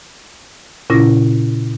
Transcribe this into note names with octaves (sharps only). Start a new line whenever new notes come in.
A#2 C#3 C#4 E4 F4 A#6